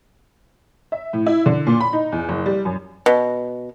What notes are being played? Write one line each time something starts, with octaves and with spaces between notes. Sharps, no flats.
E5
A2
E4
D3
A#2
B5
D#4
E2
F#1
G3
F#2
B2